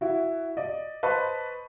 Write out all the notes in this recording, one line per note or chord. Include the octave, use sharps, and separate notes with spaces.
E4 F#4
D5 D#5
B4 C5 D#5 A5 B5 C#6